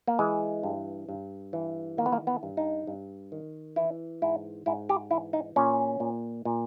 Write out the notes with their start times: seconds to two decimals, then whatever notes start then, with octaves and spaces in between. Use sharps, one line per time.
0.07 A#3
0.19 E3 G#3
0.63 G2
1.09 G2
1.53 E3
1.97 D#3 A#3
2.06 B3
2.12 A#3
2.27 B3
2.43 G2
2.57 D#4
2.87 G2
3.32 D#3
3.76 E3 E4
4.22 G#2 E4
4.66 G#2 E4
4.89 G4
5.11 E3 E4
5.33 D#4
5.56 A#2 C#4
6.00 A#2
6.45 A#2